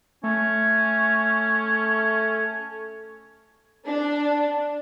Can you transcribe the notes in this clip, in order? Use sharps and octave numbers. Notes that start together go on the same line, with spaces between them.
A3 C#4
D4